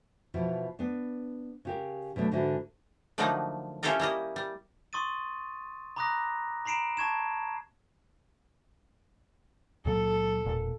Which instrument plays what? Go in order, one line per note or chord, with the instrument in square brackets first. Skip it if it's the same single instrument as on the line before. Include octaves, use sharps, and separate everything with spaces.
[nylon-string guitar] B2 E3 F3 E4
B3 D4
C#3 G4 A#4
B2 F#3 A3 D4
G#2 D3 E3 D4 E4 F#4
[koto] D3 F3 F#3 A3 A#3 D#4
C#4 E4 F4 G4 A4 A#4
G3 A#3 E4 D#5
G3
[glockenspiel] C6 C#6 D#6 A6 D#7
A#5 B5 D6 D#6 F#6 A#6
A#5 B5 C7 D7 E7
A5 C#6 G#6 E7
[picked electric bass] C#2 A#2 F#3 [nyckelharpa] A4
[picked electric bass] E1 A#2